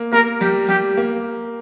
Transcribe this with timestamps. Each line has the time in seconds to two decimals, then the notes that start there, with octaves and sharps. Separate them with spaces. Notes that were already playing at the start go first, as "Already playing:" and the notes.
Already playing: A#3
0.12 A#3 A#4
0.41 G3 G4
0.69 G3 G4
0.97 A#3